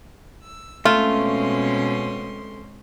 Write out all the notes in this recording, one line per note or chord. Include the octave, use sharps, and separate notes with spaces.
E6
B2 G#3 A3 C4 C#4 F4 C6